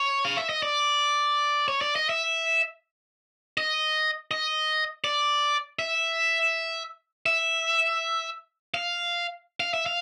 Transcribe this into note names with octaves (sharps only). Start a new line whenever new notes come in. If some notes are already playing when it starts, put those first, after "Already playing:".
Already playing: C#5
F5
E5
D#5
D5
C#5
D5
D#5
E5
D#5
D#5
D5
E5
E5
F5
F5
E5
F5